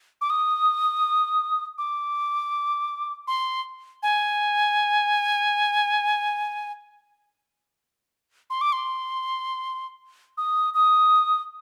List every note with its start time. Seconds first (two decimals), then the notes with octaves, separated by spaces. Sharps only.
0.21 D6
0.30 D#6
1.78 D6
3.27 C6
4.03 G#5
8.50 C6
8.61 D6
8.72 C6
10.37 D#6
10.74 D#6